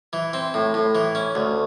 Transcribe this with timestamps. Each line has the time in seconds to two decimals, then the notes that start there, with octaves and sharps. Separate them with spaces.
0.13 E3
0.33 C4
0.54 A2
0.74 A2
0.95 E3
1.15 C#4
1.35 D2